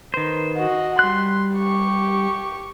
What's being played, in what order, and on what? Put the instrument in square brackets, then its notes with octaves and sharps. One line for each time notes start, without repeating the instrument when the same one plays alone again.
[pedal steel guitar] D#3 C5 [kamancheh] B4
[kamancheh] F#4 D#5
[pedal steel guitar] G3 F#6 [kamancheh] C6
[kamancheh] G4 C#6